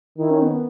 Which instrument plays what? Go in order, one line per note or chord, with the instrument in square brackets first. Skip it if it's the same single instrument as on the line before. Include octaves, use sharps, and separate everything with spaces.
[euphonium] D#3 [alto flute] E4
[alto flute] C#4
B3